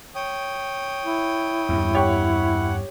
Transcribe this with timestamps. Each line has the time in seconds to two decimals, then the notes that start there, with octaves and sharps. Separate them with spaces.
0.15 C#5 G5 D#6
1.04 E4
1.69 E2 G2
1.95 G4 C#5 F#5 G5